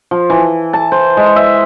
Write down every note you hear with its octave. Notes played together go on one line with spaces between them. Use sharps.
F3
E3
A5
C5
G#3
E5